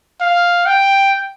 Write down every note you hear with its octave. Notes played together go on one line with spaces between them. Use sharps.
F5
G5